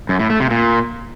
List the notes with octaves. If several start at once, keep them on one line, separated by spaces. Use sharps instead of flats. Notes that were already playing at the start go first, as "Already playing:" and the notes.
F#2
A2
A3
C3
A#2